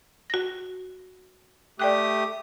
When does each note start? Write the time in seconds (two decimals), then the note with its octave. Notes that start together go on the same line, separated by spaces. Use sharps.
0.30 F#4 A#6
1.79 A3 G4 D5 G5 D#6 F#6